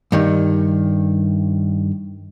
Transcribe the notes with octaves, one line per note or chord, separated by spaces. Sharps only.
G2 D#3